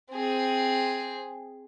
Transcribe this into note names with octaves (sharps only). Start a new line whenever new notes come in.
C4 G#4